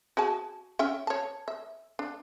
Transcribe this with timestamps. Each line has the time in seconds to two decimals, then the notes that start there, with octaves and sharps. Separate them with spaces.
0.17 F#4 G#4 A5
0.79 C#4 E5 G5
1.07 C#5 A5
1.48 E5
1.99 D4